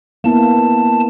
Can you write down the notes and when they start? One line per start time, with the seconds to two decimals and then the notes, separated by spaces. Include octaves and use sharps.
0.24 A#3 B3 E4 A5